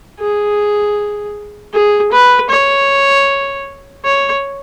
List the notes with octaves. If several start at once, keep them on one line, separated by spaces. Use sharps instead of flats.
G#4
G#4
B4
C#5
C#5